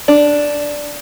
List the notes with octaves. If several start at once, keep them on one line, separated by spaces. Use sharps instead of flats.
D4